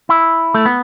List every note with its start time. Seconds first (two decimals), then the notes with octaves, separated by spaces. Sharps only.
0.09 E4
0.54 A3
0.66 B3